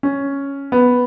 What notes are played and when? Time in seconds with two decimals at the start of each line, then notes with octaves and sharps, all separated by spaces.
0.03 C#4
0.72 B3